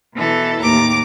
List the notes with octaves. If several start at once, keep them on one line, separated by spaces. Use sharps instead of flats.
B2 E3 A4
D#2 A2 A#5 D6